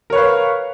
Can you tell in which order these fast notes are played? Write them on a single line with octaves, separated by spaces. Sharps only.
A#4 C#5 B4 F5